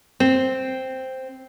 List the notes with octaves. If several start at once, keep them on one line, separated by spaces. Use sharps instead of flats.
C4